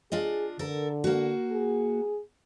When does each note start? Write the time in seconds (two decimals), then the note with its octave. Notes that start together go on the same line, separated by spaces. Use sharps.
0.12 D4 F4 G#4 D#5
0.59 D3 A4 A#4
1.04 A#3 F#4
1.52 G#4